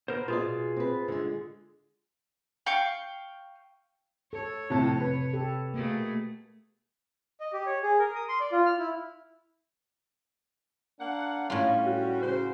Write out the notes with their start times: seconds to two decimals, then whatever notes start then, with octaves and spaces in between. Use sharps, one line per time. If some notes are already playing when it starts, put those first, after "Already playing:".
0.08 B3 A#4 C5
0.28 B2 F4 G#4 D5
0.76 C4 B4
1.08 D3 G#3
2.66 F5 G5 C#6
4.33 A4 C#5
4.70 F2 A2 C3 A5
5.00 C3 B4
5.34 G4 A4
5.74 B2 A3 A#3 G#4
7.40 D#5
7.53 G4
7.66 C#5
7.83 G#4
7.99 A#4
8.15 D#6
8.29 C6
8.40 D5
8.52 F4
8.66 F6
8.79 E4
11.00 A#3 D4 F#5
11.50 A2 G3 C#4 F4
11.86 F#4
12.22 C#3 C5